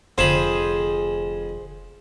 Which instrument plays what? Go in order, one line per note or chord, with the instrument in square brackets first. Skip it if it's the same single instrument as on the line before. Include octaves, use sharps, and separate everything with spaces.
[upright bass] F1 D3 [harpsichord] F2 A5 B5 [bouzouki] G#4 C5